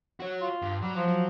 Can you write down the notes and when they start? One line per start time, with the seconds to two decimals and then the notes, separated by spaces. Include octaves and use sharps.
0.20 F#4 C#5
0.41 F4
0.62 G2
0.82 F#3 G3
0.95 F3
1.08 F#3